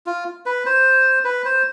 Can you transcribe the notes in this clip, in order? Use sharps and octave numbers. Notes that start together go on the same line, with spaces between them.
F4
B4
C5
B4
C5